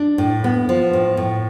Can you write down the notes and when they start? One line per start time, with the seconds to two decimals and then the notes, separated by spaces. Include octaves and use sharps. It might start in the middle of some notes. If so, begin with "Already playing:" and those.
Already playing: D4
0.18 A2
0.44 B3
0.69 F3
0.93 A2
1.17 A2